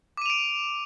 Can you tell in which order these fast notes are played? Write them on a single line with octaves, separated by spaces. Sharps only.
D6 D#7 F7 D7